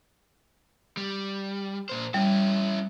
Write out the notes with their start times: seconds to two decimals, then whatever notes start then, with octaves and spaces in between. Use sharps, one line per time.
0.97 G3
1.89 A#2 C5
2.14 G3 C#4 E4